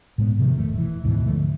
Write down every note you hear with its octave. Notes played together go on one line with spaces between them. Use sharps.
A2 G#3 B3
G#2 C3 D#3 F3
E1 A3
E3
D2 G#2 B2 E3
D3 F3 A3